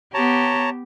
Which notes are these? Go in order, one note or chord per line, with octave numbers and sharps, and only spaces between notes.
B3 G4 C#5 A5 A#5